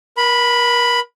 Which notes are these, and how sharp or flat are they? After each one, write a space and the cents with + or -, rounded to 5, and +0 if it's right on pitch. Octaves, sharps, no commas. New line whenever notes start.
A#4 +40 B5 +0